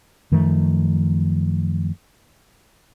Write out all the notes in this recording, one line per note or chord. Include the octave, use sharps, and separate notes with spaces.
F#2 D#3 F3 A3